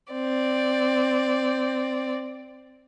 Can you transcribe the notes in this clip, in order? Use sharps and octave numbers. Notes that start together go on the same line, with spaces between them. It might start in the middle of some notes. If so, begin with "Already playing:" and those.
C4 D5